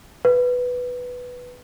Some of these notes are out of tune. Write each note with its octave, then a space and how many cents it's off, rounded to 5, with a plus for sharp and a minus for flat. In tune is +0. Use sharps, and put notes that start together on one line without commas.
B4 +0